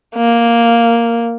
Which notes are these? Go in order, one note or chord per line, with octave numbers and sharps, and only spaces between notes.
A#3